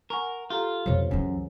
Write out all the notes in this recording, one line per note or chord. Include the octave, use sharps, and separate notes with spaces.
A#4 F#5 G#5 C#6
F4 G4 A4 A#5
F2 B2 C5 C#5
C#2 F#2 E3